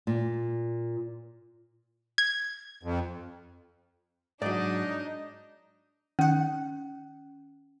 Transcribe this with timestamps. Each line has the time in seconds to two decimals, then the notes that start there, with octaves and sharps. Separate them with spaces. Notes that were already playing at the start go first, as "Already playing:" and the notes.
0.07 A#2
2.18 G#6
2.83 F2
4.42 G#2 F#3 D4 D#4 D5 D#5
6.19 D#3 C#4 F#5